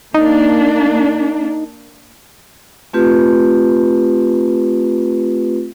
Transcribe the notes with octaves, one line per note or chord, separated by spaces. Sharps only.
A#3 D4 D#4
A3 C4 F4 G4 B4